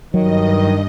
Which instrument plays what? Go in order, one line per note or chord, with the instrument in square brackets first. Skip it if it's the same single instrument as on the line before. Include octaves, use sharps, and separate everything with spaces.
[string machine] G2 D#5 [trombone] D#3 [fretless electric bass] F#3